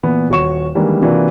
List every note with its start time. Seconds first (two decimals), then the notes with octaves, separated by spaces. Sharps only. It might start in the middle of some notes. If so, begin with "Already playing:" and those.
0.03 A#2 E3 B3
0.30 D#1 F#4 C#5 C#6 E7
0.75 D#3 E3 G3 G#3 A#3 D4
1.02 C3 E3 A#3 D4 F4 F#4